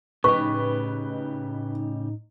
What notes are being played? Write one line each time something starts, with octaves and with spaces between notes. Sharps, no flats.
A2 C#3 D#4 G4 B4 C#6